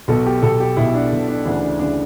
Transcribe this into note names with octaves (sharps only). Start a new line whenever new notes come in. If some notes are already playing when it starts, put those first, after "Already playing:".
B1 B2 A4
G4
B1 B2 A4
G4
B1 B2 E4
D4
B1 B2
D4
D2 C#3 E3 D4
D4
D2 C#3 E3 D4